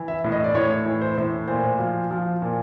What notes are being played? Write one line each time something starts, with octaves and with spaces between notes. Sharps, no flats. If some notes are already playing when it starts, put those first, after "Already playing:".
Already playing: E3
E5
A2
D#5
D5
A2 C#5
E3
C5
A2
A#2 C5
F3
F3
A#2